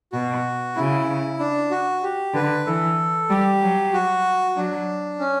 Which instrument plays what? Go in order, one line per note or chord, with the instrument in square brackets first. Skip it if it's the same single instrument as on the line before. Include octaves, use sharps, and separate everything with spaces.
[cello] B2 [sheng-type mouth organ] F#4
[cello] C#3 [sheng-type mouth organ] E4
[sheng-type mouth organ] D4
F#4
G4
[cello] D3 [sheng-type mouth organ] B4
[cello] E3 [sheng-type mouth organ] A4
[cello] G3 [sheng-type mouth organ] G4
[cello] F#3
[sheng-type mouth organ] F#4
[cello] F#3 [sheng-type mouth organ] D4
[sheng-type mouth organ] C#4